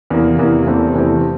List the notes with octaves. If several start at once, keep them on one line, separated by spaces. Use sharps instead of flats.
E2 C3 E3 A#3
E2 C3 E3 A#3
E2 C3 E3 A3 C4
E2 C3 E3 A3 C4